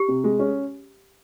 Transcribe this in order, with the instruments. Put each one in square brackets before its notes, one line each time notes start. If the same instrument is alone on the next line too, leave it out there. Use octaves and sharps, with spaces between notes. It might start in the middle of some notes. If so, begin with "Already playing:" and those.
Already playing: [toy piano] G4
[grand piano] C3
G#3
C#4